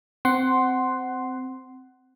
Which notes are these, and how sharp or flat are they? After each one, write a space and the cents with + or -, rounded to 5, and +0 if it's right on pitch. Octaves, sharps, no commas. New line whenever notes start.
C4 -10 F#5 +15 C6 +0